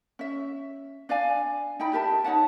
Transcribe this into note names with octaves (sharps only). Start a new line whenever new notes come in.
C#4 E5
D4 D5 F5 G#5
D#4 E4 G5 B5
G4 A#4 E5 A5
D#4 C#5 F#5 A5